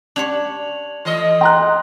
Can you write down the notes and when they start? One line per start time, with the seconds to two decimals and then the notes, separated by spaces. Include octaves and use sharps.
0.16 D4 G4 C#5 G#6 F7 F#7
1.05 E3 A3 D#5
1.41 G5 A#5 C6 F#6